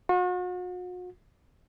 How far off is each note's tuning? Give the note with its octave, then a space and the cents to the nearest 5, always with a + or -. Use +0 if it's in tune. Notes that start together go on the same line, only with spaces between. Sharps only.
F#4 -40